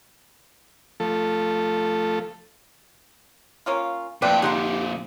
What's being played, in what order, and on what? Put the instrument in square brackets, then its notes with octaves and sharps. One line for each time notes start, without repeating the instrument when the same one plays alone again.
[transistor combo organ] F3 A3 A4
[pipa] A#3 C#4 F4
[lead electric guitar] F2 A#2 [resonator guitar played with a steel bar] A3 B4 [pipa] C5 D5 [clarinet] G5
[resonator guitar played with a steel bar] D3 F4 F#5 [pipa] D#4 G#4 [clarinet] G4